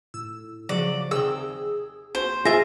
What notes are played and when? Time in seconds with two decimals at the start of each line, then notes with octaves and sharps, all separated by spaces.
0.14 A2 E6
0.69 C#3 F3 F#3 F#4 D5
1.11 D#2 C3 G#4 G5 E6
2.15 A#1 F#4 C5 E7
2.45 F4 G#4 E5 A#5